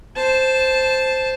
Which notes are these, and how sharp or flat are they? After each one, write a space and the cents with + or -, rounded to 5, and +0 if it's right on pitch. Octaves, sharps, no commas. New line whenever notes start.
C5 +0 A5 -10